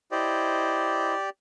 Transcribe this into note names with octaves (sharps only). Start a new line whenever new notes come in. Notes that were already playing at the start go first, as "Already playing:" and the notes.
E4 G4 C5 D5 D#5